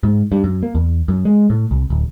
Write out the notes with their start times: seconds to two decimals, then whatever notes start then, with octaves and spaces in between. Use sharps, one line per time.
0.03 G#2
0.32 G2
0.44 F#2
0.63 A#3
0.75 E2
1.08 F#2
1.25 G#3
1.50 A2
1.71 C2
1.90 D1